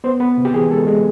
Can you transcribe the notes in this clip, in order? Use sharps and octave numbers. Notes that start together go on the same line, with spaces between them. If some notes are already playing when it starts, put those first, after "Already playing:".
B3 C5
B3 B4
C3
G4
E3 G#4
G#3 A4
G#3